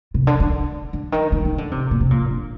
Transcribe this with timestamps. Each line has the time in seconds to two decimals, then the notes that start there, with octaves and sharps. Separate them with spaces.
0.14 C3
0.27 D3
0.40 D3
0.93 D3
1.12 D#3
1.32 D#3
1.45 D#3
1.58 D3
1.71 C3
1.91 A#2
2.01 C3
2.11 A#2
2.30 D3